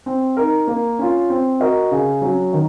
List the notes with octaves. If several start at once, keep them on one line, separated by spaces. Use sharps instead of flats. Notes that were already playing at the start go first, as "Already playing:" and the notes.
C4
D#4 A#4
A#3
C#4 F4
C4
F#4 A#4 D#5
C#3
F#3 C#4
D#3